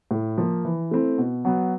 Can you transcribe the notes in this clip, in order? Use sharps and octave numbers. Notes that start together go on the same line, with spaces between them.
A2
F3 A#3
E3
A3 C4 E4
B2
F#3 B3